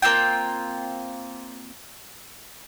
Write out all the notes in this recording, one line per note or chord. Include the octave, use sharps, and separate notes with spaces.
A#3 C4 F4 G5